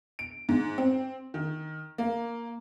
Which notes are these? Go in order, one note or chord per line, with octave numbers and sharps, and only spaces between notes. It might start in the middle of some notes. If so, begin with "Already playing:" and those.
D7
G#2
C4
D#3
A#3